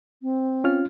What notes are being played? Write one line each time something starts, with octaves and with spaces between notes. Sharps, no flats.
C4
C#4 F4 F6